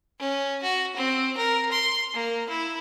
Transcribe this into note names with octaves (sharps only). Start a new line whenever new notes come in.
C#4
F#4
C4
A#4
C6
A#3
E4